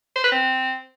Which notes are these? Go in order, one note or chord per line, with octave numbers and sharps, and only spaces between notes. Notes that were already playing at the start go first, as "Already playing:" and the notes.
C5
B4
C4